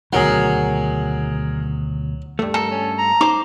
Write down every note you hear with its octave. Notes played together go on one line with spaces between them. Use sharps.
D2 B2 D#3 F#3 G#4 A#4 F#5
G2 A3
A4 A#4
C#4
A#5
D#4 C5 D6